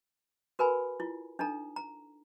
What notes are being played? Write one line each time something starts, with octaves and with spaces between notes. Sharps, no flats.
F#4 A#4 B4 G#5 B5
E4 F4
D4 D#4 A4 A#5
A#5